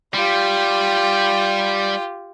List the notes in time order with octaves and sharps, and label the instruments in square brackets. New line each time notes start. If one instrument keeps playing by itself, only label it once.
[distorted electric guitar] G3 [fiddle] F4 G4